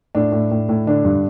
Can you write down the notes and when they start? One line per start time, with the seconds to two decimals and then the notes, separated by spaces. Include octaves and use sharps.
0.15 A2 D4
0.32 A2
0.51 A2
0.69 A2
0.87 D3 D4
1.05 G2